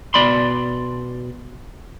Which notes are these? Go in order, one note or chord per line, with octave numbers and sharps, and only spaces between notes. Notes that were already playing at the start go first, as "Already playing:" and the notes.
B2 D5 B5 C6